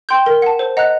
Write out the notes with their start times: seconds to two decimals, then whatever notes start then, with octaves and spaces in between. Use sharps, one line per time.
0.09 G5 C6 G6
0.26 A#4
0.42 F#5 A5
0.59 C5
0.77 D#5 F#5 A#5 F#6